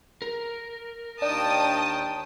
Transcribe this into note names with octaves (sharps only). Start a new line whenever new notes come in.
A#4
D#2 D#3 D4 G5 A5 D#6